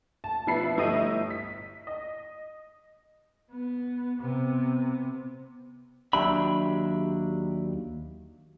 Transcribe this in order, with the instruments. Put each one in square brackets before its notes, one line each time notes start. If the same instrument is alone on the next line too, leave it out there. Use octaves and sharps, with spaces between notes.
[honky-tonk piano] A5
B2 F3 E4 B4 B5 C7
G1 A3 E4 G4 D#5 D#7
B6
D#5
[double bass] B3
C3 B3
[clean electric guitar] D#2 F#3 D4 G4 E5 B5